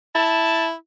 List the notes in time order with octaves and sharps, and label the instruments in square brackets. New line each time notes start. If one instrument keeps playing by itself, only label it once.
[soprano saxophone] E4 [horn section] A5